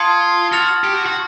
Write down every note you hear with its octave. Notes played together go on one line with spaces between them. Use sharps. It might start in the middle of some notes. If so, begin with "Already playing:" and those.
Already playing: F4 A5 C6 D#6 G#6 C#7
F#4 F6 A6 C#7 F7
G4
F#4
F#4